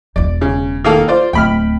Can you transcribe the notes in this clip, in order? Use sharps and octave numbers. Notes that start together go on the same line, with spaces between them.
E1 E4 D5
C#3
D#3 A#3 A4
F4 C5 D5
D1 A3 G5 B5 F6